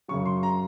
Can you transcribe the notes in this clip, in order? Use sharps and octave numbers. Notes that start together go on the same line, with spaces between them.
F#2 C#3 F#3 C#6
C6
A#5